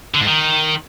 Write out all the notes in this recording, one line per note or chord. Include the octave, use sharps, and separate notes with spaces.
D3
G#2
D#3